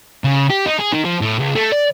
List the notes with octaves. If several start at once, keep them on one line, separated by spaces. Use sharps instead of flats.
C#3
G4
D#4
G#4
D#3
F3
A2
C#2
A3
D5